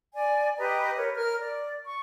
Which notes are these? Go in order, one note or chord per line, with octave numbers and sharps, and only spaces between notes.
D5 G#5
G4 B4 D#5 A#5
A#4 B4 C#5
A#4 F6
D5
C#6